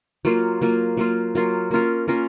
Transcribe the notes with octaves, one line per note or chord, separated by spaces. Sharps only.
F#3 A#3 F4
F#3 A#3 F4
F#3 A#3 F4
F#3 A#3 F4
A#3 C#4 F4 A#4
A#3 C#4 F4 A#4